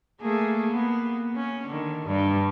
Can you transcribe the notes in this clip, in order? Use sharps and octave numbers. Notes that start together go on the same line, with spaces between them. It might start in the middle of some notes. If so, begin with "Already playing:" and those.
A3 A#3 G#4
A#3 B3
C#4
D3 D#3
G2 G3